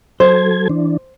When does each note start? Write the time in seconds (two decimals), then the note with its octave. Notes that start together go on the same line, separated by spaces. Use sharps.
0.20 F#3 A4 C5 G#6
0.69 E3 D4